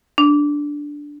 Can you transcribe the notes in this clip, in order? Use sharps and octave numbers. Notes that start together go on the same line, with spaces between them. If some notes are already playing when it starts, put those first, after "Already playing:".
D4